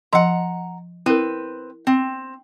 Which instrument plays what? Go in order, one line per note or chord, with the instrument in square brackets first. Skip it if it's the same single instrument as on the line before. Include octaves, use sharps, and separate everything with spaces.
[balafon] F3 D#5 C6 [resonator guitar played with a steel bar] F#5 A#5
[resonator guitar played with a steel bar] C4 B4 [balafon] E4 A#4
[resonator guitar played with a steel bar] C4